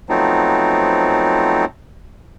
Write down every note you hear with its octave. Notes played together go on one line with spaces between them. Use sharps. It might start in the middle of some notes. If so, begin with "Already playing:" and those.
F3 F#3 A3 B3 C4 D#4